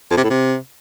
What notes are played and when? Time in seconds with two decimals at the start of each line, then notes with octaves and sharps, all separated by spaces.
0.11 F2
0.17 C3
0.24 A2
0.30 C3